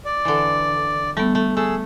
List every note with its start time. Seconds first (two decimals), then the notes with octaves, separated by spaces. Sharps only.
0.05 D5
0.25 D3 E3
1.17 G3 A3 B3
1.35 A3
1.57 A3 G#4 E6